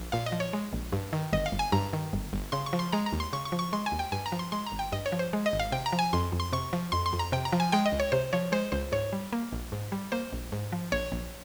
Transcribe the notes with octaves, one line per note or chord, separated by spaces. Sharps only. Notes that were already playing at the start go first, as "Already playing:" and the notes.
Already playing: A#1
A#2 F5
D#5
F3
C#5
G#3
A#1
G2
D#3
G1 D#5
F5
G1
G#5
G2 A#5
D#3
G1
G1
C#3 C6
C#6
F3
C6
G#3 A#5
A#5
D#2
C6
C#3 C#6
C#6
F3
C#6
G#3 C6
G#5
D#2
G5
G2 G#5
A#5
F3
C6
G#3 C6
A#5
G#1
G5
G2 D#5
C#5
F3
C5
G#3
D#5
G#1
F5
C3 G5
A#5
F3
G#5
F2 C6
F2
C6
C3 C#6
F3
F2 C6
C6
F2
A#5
C3 G5
A#5
F3
G#5
G#3 G5
D#5
C#2
C#5
C3 C5
F3 C#5
G#3 C5
C#2 C5
G#2 C#5
G3
A#3
A#1
G#2
G3
A#3 C5
A#1
G#2
F3
A#1 C#5
A#1